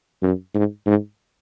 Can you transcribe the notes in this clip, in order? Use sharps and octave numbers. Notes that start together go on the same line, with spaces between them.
F#2
G#2
G#2